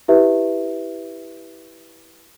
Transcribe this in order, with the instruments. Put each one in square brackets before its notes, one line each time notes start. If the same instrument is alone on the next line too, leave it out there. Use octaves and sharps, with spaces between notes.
[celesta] E4 G4 B4 E5